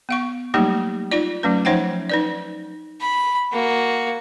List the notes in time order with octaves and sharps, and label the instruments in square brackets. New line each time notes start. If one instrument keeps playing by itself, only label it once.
[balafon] B3 F5 C#6
F#3 G3 A3 A#3 D#4 G4
D#4 F4 D5
F#3 A3 C#4 B4
F3 D#4 C5 E5 F#5 G5
D#4 B4 D5
[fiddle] B5
A#3 F#4